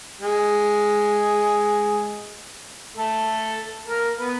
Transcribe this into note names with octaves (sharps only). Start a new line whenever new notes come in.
G#3 G#4
A3 A4
A#3 A#4
B3 B4